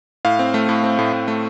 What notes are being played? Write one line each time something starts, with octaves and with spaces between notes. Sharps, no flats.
A2 F5
C4
A3
A2
C4
A2
A2
A3